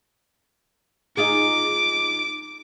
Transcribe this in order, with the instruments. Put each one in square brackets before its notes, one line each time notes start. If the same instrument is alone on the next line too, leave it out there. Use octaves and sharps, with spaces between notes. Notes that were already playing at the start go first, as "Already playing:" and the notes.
[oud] D#4 F4 G#4 [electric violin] D6